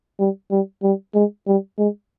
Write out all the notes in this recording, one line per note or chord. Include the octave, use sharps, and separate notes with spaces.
G3
G3
G3
G#3
G3
G#3